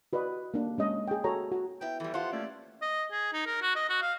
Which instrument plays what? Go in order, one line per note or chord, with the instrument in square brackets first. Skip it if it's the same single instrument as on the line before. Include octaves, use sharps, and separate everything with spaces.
[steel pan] F#4 B4 D5 D#5
A#3 D4
G#3 C#4 D#5
G#4 G5
F#4 A4 C#5 A#5
F#4
[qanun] B3 E4 [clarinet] G5
[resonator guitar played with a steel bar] E3 G3 [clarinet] A4
[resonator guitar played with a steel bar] F4 A4 [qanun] G4 [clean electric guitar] C5 [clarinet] F#5
[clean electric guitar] A3 A#3 C#4 [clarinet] D5
[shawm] D#5
G#4
D#4
A#4
F#4
D#5
F#4
F5